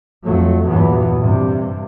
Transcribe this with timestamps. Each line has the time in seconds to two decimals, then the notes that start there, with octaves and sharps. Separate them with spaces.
0.24 F2 F#3 A3
0.68 E2 G2 A#2 E3 F#3 B3
1.20 G2 C3